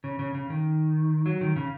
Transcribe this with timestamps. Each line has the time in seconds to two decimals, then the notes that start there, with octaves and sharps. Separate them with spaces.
0.04 C#3
0.19 C#3
0.35 C#3
0.50 D#3
1.26 F#3
1.41 D#3
1.56 C#3